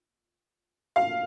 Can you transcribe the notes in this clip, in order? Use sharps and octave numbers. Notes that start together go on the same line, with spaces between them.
F5